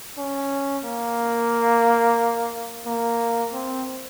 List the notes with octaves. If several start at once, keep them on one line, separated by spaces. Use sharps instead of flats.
C#4
A#3
A#3
C4